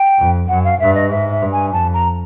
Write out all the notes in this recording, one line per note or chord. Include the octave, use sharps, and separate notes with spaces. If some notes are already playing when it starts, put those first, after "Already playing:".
Already playing: G5
F2
F#2 F#5
F5
G2 E5
D#5
G#2 E5
E5
G2
G#5
F2 A5
A#5